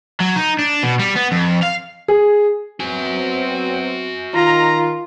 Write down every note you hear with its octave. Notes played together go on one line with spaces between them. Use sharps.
F#3
D#4
D4
B2
G3
B3
F2
F5
G#4
F#3 B3 C4 F#4 G#5
D#3 F4 A#5